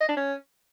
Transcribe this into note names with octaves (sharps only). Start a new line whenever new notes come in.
D#5
D4
C#4